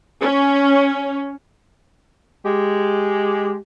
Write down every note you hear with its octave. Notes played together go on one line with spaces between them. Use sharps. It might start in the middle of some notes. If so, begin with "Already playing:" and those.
C#4
G#3 G4